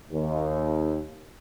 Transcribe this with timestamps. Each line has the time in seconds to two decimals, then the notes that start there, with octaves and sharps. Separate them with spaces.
0.10 D#2